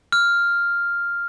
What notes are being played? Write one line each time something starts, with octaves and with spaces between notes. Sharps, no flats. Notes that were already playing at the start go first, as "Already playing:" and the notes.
F6